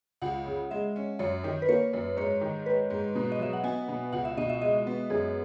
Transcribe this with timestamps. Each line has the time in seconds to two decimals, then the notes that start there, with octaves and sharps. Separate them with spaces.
0.22 C#2 F#5
0.46 C#3
0.71 G#3 E5
0.96 C#4
1.19 F#2 C#5
1.44 D#3
1.62 B4
1.69 A#3 C#5
1.93 F#2
2.17 G#2 C#5
2.41 D#3
2.66 G#3 B4
2.90 G#2
3.15 B2
3.32 D#5
3.39 F#3 E5
3.53 F#5
3.64 B3 G#5
3.88 B2
4.12 C#2 F#5
4.25 E5
4.37 B2 D#5
4.49 E5
4.61 G#3 D#5
4.87 B3
5.10 F#2 G#4